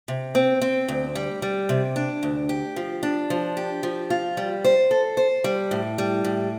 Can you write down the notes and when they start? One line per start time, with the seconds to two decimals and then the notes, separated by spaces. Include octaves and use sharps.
0.08 C3
0.35 C4
0.62 C4
0.88 D2
1.15 G3
1.42 G3
1.69 C3
1.96 D4
2.23 D2
2.49 G4
2.76 F3
3.03 D4
3.30 F3
3.57 G4
3.83 F3
4.10 F4
4.37 G3
4.64 C5
4.91 A4
5.17 C5
5.44 G3
5.71 A2
5.98 G3
6.24 A2